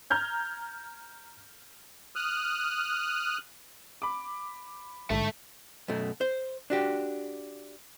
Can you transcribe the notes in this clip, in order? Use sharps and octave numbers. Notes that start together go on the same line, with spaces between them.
A#5 F6 G6 G#6
D#6 F6 F#6
B5 D6
A#1 G#2 D3 A4 E5 A5
F#2 B2 A3
C5
D4 F#4 G4